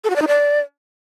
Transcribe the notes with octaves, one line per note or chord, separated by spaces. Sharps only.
A4
F#4
D5
D#4
D5